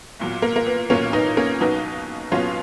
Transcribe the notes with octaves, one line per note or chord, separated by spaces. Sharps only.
B1 A#2 F#3
A#3
A#3
B3
B1 A#2 F#3 A#3 C#4
B3 D#4
A#3 C#4
B1 B2 F#3 B3 D#4
B1 B2 F#3 C#4 F4